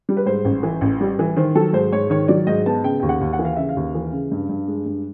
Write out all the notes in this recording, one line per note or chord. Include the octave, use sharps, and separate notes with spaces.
G3
B4
G#2 C5
A1
E3
A1
G3
E3
D#3 C5
F#3 A4
G#2 C5
G#2 C#5
D#3 C#5
F#3 D5
G#2 D#5
B3 A5
C#3 G5
D#2 G5
F#5
D#2
F#5
E3
F5
C#3 E5
F5
D#2
E3
C#3
G2
G2
G#3
G2